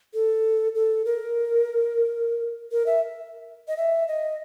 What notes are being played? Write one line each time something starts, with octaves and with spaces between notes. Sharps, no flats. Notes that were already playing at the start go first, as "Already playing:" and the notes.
A4
A4
A#4
A#4
E5
D#5
E5
D#5